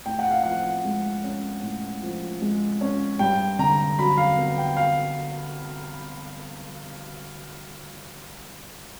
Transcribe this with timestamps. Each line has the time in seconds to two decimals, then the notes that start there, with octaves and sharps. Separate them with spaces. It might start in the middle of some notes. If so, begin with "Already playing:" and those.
0.06 A2 G5
0.19 F#5
0.31 F5
0.43 F3 F#5
0.85 G#3
1.24 C#4
1.62 A2
2.03 F3
2.42 G#3
2.81 C#4
3.19 G2 G5
3.59 D3 A#5
3.99 F#3 B5
4.17 F5
4.38 B3
4.58 G5
4.77 F5